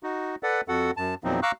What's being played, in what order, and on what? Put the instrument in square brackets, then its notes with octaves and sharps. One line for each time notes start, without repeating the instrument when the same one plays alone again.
[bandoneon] D#4 F#4
A4 B4 D5 F#5
F2 F#4 A4 F#5
F#2 A5
E2 A#2 F3 F#3 C4 D#4
F5 A#5 C#6 D6 E6 F#6